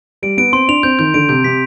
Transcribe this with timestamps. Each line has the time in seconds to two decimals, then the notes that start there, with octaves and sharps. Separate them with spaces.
0.23 G3 D7
0.37 B3 D7
0.52 C4 C6
0.68 D4 F7
0.83 C4 G6
0.99 D#3 G6
1.14 D3 D7
1.29 C3 G6
1.44 C3 B6